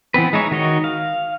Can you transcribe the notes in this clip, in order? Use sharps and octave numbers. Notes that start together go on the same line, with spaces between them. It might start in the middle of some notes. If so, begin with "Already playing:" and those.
E3 B3 C4 B4
G#3 D#4 E4 C#5
D#3 F#4 C#5 D#5
F5